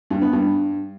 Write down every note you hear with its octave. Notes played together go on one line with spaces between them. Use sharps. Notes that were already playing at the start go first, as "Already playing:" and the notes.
G2
B3
G2